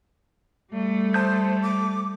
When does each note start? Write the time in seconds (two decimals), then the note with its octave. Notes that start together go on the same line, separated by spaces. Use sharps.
0.71 G3 A3
1.14 C5 A5 D#6 G6
1.62 D6